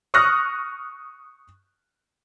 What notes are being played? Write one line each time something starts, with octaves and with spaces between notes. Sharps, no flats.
C#6 D#6 F6 F#6 A#6